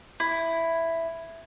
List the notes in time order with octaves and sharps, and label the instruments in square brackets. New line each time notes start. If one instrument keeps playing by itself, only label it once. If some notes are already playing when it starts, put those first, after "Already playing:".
[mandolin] E4